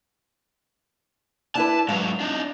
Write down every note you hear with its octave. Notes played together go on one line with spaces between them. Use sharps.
D4 E4 B4 A5
G#2 F#3 F5
D4 D#4